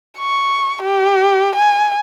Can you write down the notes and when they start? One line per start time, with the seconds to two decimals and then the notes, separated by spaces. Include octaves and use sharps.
0.18 C#6
0.82 G4
1.55 G#5